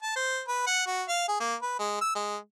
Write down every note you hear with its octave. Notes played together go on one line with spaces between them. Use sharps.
A5
C5
B4
F#5
F#4
F5
G#4
A#3
B4
G#3
E6
G#3